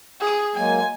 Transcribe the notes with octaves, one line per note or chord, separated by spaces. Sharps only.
G#4 D#6
F#3 G#3 A#3 G#5